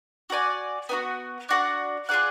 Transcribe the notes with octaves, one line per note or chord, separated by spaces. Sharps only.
F#4 D5 G#5
B3 D#4 F#4
D4 F#4 D5
F4 G#4 D5 F#5